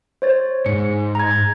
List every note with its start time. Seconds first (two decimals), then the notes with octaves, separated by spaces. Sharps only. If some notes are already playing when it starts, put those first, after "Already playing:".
0.22 C5 C#5 A6
0.66 G#2 C#7
1.15 A#5 G#6